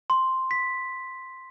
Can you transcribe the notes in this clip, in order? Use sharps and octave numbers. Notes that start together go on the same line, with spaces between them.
C6
B6